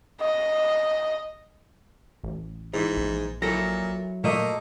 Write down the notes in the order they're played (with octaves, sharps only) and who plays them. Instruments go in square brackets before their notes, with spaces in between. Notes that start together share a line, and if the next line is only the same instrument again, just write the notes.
[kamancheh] D#5
[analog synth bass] A1
[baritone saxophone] G#2 [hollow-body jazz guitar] E3
[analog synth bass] A#1
[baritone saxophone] A#2 [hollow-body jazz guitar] F#3 E4 A4 [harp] A#6
[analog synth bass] A#2 [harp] A3 D#5 [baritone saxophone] A#3